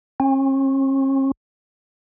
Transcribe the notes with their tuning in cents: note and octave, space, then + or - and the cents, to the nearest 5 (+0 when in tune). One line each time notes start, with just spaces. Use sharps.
C#4 -45